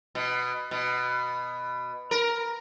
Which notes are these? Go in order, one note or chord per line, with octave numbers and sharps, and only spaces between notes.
B2
B2
A#4